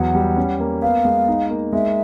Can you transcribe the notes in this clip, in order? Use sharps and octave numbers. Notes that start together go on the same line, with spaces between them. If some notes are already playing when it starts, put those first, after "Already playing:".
Already playing: E2 F#3 F#5
G3
C#4
A#3
B3 F5
G#3
D#4
A#3
G#3 E5